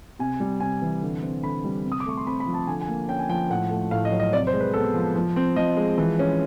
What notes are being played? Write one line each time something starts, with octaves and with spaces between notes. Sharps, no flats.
C3 G#5
G3
C3 G#5
E3
D3
C4
D3 B5
G3
C3
D#6
D6
A3 C#6
C6
C4 B5
B5
F3
A5
D3 G#5
G#5
A#3
C#4 G5
G#5
F3 G5
A2 F#5
A3
A2 F5
D#5
F#3
D#5
C3 D5
C5
G#3
B4
B3 A4
F3
F3
C4
F3 D#5
G#3
E3
C#4